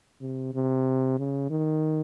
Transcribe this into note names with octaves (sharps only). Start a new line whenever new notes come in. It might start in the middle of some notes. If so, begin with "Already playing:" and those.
C3
C3
C#3
D#3